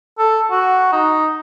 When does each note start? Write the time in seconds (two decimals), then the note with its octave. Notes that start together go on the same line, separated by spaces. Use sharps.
0.19 A4
0.51 F#4
0.92 D#4